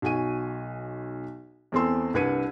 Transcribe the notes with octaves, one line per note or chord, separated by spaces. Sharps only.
B1 F#4 G#5 D#7
E2 E3 C4 A4 C6 E6
C2 D4 B4 G#6 C#7 D#7